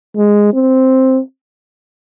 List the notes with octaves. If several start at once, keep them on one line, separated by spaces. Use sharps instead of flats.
G#3
C4